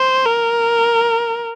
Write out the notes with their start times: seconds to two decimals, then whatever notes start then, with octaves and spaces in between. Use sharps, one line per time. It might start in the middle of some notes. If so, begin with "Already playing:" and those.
Already playing: C5
0.26 A#4